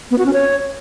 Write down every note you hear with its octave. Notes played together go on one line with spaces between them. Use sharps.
B3
F#4
C#4
C#5